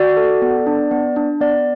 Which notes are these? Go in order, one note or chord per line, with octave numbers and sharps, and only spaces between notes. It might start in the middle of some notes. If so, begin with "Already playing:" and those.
Already playing: F#4 D5
A4
B3
D4
B3
D4
B3 D5